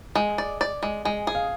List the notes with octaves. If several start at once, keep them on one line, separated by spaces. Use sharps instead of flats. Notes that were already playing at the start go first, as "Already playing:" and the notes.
G#3 G#5
D5
D5
G#3
G#3 G#5
G#4
F5